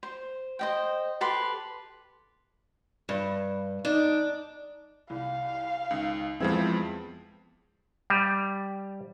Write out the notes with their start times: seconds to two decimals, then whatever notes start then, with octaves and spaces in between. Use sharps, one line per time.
0.03 C5
0.59 C5 D#5 G5
1.21 G4 A4 B4 C6
3.09 G2
3.85 D4 D#4
5.10 C2 F5
5.91 C#2 D#3
6.40 F2 E3 F3 G#3 B3 C4 E5 G#6
8.10 G3